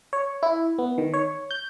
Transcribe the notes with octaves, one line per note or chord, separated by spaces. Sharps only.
C#5
E4
B3
D#3
C#5
G6